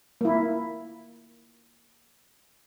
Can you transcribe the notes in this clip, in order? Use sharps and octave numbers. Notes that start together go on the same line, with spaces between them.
A#3 E4